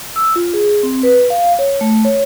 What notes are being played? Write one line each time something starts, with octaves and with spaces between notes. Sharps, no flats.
E6
F4
G#4
C4
B4
F5
C#5
A3
C#5